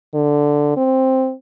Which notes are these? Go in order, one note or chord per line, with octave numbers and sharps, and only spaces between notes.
D3
C4